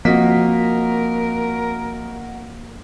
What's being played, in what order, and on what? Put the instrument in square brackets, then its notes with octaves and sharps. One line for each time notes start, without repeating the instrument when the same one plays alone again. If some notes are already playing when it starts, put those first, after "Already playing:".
[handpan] F3 C4 [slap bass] A#3 [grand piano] F#4 D#5 B6 [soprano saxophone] A#4